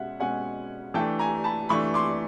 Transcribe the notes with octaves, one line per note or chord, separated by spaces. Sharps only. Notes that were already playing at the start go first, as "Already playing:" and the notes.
Already playing: B2 G#3 C#4 E5 F#5
B2 G#3 C#4 F#5 G#5
E3 A3 D4 G5 A5
G#5 A#5
A5 B5
E3 A3 D4 B5 C#6
C6 D6